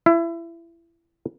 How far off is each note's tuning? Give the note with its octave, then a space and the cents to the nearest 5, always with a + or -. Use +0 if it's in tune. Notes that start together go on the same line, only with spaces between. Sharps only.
E4 +25